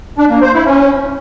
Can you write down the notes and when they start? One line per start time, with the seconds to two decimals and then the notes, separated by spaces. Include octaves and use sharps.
0.18 D4
0.30 A#3
0.42 C5
0.54 E4
0.65 C#4